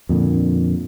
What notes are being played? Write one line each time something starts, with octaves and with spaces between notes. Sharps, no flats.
F2 A#2 D3